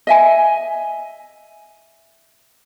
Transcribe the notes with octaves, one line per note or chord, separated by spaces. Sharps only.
D#5 E5 G#5